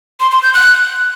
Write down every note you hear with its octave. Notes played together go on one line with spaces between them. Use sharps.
C6
C6
G6
F#6